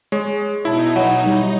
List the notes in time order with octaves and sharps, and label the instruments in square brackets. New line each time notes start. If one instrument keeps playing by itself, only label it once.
[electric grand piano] G#3 [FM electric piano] C#5
[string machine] B2 D#4 [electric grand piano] E4 [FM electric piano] E5 A5
[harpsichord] F#3 [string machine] D#4
[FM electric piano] G3